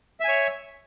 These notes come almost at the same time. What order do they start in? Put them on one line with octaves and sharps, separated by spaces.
E5 G#5 C#5